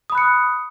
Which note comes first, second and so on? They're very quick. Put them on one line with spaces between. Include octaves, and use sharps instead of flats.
D#6 B5 F#6 C#7